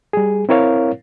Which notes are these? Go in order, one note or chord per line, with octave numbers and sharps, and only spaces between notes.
G3 G#4
C4 E4 A#4 C#5 F5